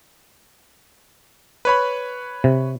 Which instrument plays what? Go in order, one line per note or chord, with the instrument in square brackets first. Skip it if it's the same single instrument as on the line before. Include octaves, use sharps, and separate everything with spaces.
[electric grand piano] B4 C#5 B5
[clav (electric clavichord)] C3